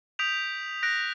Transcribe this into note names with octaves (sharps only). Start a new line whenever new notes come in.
D#6 G6 B6 D7 F7
F#6 A#6 D7